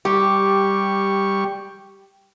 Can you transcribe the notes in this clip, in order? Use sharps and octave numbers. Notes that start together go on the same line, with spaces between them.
G3 G4 C#6